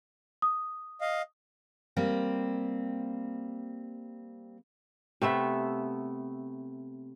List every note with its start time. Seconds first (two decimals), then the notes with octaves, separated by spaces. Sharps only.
0.42 D#6
1.01 D#5 F5
1.97 G3 A#3 C4
5.22 C3 A3 B3 E5